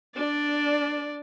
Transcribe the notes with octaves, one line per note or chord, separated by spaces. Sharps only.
D4 D5